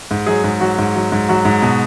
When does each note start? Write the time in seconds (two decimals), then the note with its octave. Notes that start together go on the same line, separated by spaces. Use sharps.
0.11 G#2
0.27 F#3 G#4
0.44 G#2
0.61 F#3 F#4
0.78 G#2
0.95 F#3
1.12 G#2
1.29 F#3 F#4
1.45 G#2
1.62 B2